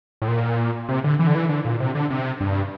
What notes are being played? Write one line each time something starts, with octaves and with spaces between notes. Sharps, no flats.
A2
A#2
C3
D3
E3
D3
E3
D3
A#2
C3
D3
C3
G2